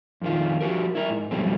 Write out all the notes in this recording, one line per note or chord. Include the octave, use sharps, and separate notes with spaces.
F2 D#3 F4
F3 F#4 G4 A#4
E4 A#4
G#2
F2 B2 F#3 G3 A3 C4